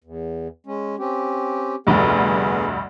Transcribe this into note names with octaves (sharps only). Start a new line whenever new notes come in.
E2
G#3 C#4
C4 C#4 G4
F1 D2 G2 B3 G#4